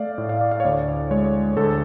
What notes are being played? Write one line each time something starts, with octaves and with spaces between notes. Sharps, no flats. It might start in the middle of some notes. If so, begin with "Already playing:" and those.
Already playing: A3 D5 F5
A2
F5
D5
F5
C#5
D2 D5
G#3 C#5
D2 A4